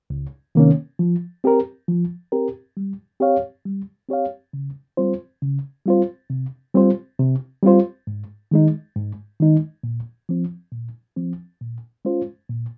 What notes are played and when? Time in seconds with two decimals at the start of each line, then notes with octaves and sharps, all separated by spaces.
0.10 C#2
0.55 C3 D#3 A#3 C#4
0.99 F3
1.44 C4 G4 A#4
1.88 F3
2.32 C4 G4 A#4
2.77 G3
3.20 C4 G4 C#5 F5
3.65 G3
4.09 C4 G4 C#5 F5
4.53 C#3
4.97 G3 C4 F4 C5
5.42 C#3
5.86 G3 C4 F4 C5
6.30 C3
6.75 G3 C4 F4 C5
7.19 C3
7.63 G3 C4 F4 C5
8.07 G#2
8.51 D#3 G#3 D#4
8.96 G#2
9.40 D#3 G#3 D#4
9.84 A#2
10.29 F3 C4
10.72 A#2
11.17 F3 C4
11.61 A#2
12.05 G#3 C#4 F4 C5
12.50 A#2